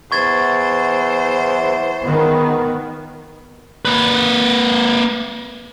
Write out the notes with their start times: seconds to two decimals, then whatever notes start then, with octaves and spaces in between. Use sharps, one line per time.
0.12 E2 C5 C#6 G#6 A6
2.04 C#2 D#3 B3
3.85 A#3 B4